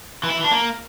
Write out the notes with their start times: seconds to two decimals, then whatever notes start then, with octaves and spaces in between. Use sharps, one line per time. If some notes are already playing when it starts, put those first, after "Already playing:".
0.24 E3
0.30 E4
0.37 E3
0.44 D4
0.51 A#3